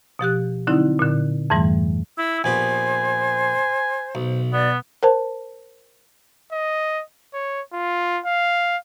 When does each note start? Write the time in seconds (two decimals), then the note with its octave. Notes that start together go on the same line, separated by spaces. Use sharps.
0.19 B2 F3 G4 F#6
0.67 D3 F#3 C4 D#4 E4
0.99 A#2 D3
1.50 F2 G#2 E3 G3 A3
2.18 E4 E6
2.44 A#1 B3 G4 C5 G#5
4.15 B1
4.53 B3 D5
5.03 A#4 C5 A5
6.52 D#5
7.34 C#5
7.73 F4
8.26 F5